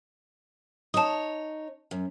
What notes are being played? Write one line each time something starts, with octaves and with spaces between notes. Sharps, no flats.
D#4 C#5 A5 D#6
F#2